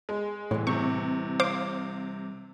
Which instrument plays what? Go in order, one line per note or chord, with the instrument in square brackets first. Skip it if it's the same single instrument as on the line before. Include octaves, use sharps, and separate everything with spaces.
[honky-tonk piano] G#3
[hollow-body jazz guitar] C2 E3 [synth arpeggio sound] A2
[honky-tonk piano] C3 [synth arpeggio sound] C#6
[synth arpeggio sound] C5 F5 D6